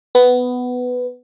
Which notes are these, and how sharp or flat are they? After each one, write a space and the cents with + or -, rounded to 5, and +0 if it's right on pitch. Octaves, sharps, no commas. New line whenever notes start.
B3 +10